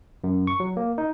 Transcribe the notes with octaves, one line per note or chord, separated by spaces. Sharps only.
F#2
C#6
F#3
A#3
D#4